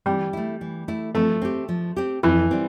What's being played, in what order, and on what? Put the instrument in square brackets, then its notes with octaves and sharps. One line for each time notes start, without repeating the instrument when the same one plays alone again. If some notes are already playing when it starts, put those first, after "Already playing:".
[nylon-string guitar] E3 [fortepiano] G3
[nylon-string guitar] A3 E4
E3
A3 E4
[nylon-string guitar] F3 [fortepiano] A3
[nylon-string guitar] C4 G4
F3
C4 G4
[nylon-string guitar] F2 [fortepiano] E3
[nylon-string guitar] G3 C4